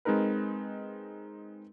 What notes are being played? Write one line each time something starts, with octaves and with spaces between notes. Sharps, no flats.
G#3 C4 D#4 A#4 B4